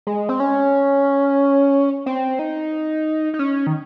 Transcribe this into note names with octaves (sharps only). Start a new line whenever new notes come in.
G#3
C4
C#4
C4
D#4
D#4
C#4
D#3